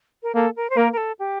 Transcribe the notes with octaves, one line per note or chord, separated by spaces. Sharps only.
A#4
A#3 A4
A#4
C5
A#3 A#4
A#4
A4
G4